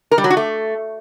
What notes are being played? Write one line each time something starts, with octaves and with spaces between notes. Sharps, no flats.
A#4
G3
F#3
F#4
A3